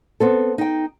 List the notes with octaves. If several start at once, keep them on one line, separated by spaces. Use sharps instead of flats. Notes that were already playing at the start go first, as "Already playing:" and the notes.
B3 C4 A4
D#4 G5